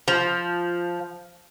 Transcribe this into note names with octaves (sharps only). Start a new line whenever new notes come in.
F3